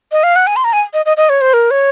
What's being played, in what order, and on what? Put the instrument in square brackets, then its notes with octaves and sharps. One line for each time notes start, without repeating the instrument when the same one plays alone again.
[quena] D#5
F5
F#5
G#5
C6
A#5
G#5
D#5
D#5
D#5
C#5
C5
A#4
C#5